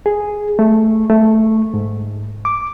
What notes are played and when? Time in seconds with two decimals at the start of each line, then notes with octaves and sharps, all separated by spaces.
0.06 G#4
0.59 A3
1.10 A3
1.74 G#2
2.45 D6